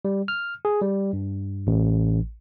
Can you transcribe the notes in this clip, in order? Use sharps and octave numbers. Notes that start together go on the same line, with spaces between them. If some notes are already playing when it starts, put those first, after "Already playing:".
G3
F6
G#4
G3
G2
A1